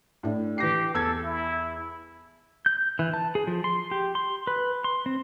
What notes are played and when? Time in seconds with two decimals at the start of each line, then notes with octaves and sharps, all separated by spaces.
0.23 A2 D4
0.58 E3 G4 A#6 C7
0.94 E2 A4 E6 G#6
1.24 E4
2.66 G6
2.99 E3
3.14 A5
3.35 G#4
3.47 F3
3.64 C6
3.91 G4
4.15 C6
4.47 B4
4.84 C6
5.06 C4